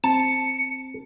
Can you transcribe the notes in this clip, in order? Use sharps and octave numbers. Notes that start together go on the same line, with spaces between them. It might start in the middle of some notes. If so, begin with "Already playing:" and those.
C4 A5 C#7